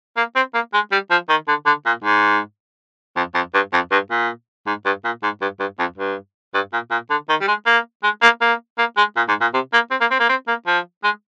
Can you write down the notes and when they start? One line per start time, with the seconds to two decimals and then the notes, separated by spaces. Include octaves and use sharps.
0.17 A#3
0.36 C4
0.54 A#3
0.73 G#3
0.92 G3
1.11 F3
1.29 D#3
1.48 D3
1.66 D3
1.86 A#2
2.04 G#2
3.16 F2
3.35 F2
3.54 G2
3.73 F2
3.92 G2
4.11 A#2
4.67 G#2
4.86 G2
5.05 A#2
5.23 G#2
5.42 G2
5.60 G2
5.79 F2
5.97 G2
6.54 G2
6.73 A#2
6.91 A#2
7.10 D3
7.29 D#3
7.41 G3
7.48 G#3
7.66 A#3
8.03 G#3
8.22 A#3
8.41 A#3
8.78 A#3
8.97 G#3
9.17 A#2
9.28 G#2
9.41 A#2
9.54 C3
9.73 A#3
9.91 C4
10.01 A#3
10.11 C4
10.20 A#3
10.29 C4
10.48 A#3
10.67 F3
11.04 G#3